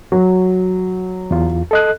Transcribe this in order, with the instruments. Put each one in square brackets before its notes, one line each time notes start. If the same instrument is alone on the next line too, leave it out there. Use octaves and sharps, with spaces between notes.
[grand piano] F#3
[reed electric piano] E2 F4
A4 D#5 F#6